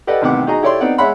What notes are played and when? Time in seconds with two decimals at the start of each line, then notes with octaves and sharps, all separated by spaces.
0.07 G4 A4 B4 D5 D#5 F#5
0.22 A1 C3 D#3 B3 F#5 D6
0.47 D#4 F#4 G#4 D#5 A#5
0.62 E4 G4 A4 C#5 D5 C6
0.80 B3 C4 D#4 D5 F#5
0.98 G#3 C#5 E5 F#5 B5 C6